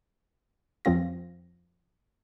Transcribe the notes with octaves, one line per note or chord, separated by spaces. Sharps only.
F2 F3 C4 F4 A#6